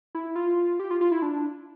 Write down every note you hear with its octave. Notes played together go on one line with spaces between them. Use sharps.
E4
F4
G4
F4
F4
E4
D4